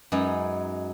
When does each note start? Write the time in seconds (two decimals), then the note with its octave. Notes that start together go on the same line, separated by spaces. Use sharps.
0.12 F#2 G#3 D#4 B4